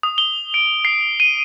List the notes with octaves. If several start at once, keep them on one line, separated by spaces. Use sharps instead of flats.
D#6
G7
D7
C7
D#7